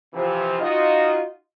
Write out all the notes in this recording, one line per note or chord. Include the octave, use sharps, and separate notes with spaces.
C3 E3 F3
D#4 F4 F#4 D#5